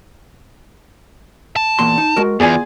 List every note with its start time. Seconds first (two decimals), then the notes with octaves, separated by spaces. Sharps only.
1.56 A5
1.79 E2 A#2 C6
1.98 D#4
2.16 G#3 F#4 A#4
2.40 E2 B3 F4 G#4 D5 G#5